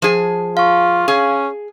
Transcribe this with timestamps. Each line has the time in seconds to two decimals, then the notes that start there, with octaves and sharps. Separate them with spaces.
0.02 F3 G#4
0.57 F4 F5 C#6
1.08 C#4 G#4